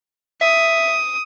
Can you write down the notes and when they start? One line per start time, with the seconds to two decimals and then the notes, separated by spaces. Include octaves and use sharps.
0.41 E5 D#6